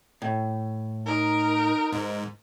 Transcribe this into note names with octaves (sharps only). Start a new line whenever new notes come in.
A2
D#4 A#4
G#2